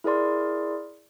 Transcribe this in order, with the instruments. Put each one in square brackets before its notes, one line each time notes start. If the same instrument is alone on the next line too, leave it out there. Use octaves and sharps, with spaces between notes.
[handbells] E4 G#4 A#4 D5 C6